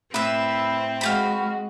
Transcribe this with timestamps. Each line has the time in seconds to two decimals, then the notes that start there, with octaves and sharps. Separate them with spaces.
0.14 A2 C4 E4 B4 E5
1.01 G#3 F#4 F5 G5 B5